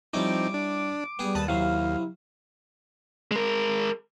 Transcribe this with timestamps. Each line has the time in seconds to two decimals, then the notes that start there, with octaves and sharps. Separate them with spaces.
0.13 F3 G3 C4 C#4 D#4 E4 D6
0.54 D4
1.19 G3 B3 G4 G#4
1.35 D#2 B4 A5 D#6
1.48 C3 F#3 E4 F5
3.31 G#3 A#4